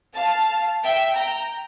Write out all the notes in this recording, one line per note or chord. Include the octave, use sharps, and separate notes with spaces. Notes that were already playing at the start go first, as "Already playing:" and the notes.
F5 A5
E5 G5
G5 A#5